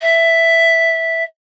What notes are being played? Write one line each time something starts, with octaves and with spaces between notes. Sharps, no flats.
E5